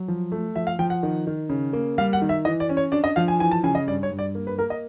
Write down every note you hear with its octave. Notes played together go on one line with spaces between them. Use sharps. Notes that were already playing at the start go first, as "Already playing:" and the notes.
Already playing: F#3
F3
A3
F3 E5
F5
F3 G5
F#5
D#3
D#3
C#3
A#3
G3 F5
F#5
D#3
E5
E3 D#5
D5
C#4
C#5
D4 D5
D#5
F3 F5
G#5
E3 G#5
A5
C#3 G#5
D#5
G2 D5
C#5
G2
D5
A#3
B4
A#3 A#4
D#5